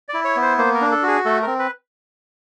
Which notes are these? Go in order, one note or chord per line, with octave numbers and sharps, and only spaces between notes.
D5
E4
C#5
B3
C5
A#3 C5
A#4
D4
A4
F#4 G#4
A3 A4
C4 A#4
B4